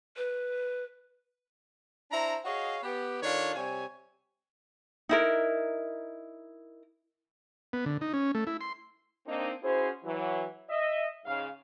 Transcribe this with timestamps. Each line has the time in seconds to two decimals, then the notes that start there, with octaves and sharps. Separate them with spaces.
0.17 B4
2.11 D4 E4 C5 A#5
2.45 F#4 G#4 C#5 D#5 F5
2.83 B3 G4
3.23 D#3 D4 F4 A4 C#5
3.55 C3 G3 C#5 G#5
5.09 D#4 E4 A#4
7.73 B3
7.86 D3
8.01 D#4
8.14 C#4
8.35 A3
8.47 E4
8.61 C6
9.27 A#3 C4 D4 D#4
9.63 C#4 E4 F#4 G#4 C5
10.04 E3 F#3
10.70 D#5 E5
11.25 G#2 C#3 F5